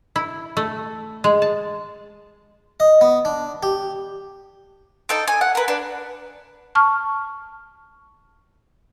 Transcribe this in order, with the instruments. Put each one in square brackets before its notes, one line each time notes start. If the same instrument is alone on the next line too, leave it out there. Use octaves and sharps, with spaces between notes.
[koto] E4
A3
G#3
A5
[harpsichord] D#5
B3
D4
G4
[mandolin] D#4 A4 G5
G#5
F#5
A#4 B4
D4 B4
[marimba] A5 C#6 F6